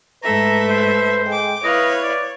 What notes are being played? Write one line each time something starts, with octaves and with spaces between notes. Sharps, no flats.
G#2 A3 A4 B4 E5 A#5
C5
G#3 G5 D6
E4 B4 C#5 D#5 F5
D5